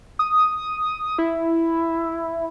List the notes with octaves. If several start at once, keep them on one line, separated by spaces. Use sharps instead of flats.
D#6
E4